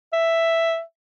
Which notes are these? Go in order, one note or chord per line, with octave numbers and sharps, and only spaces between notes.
E5